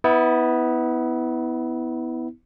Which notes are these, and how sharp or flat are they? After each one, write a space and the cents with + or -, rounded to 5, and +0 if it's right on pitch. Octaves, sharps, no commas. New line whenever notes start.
B3 +10 E4 -25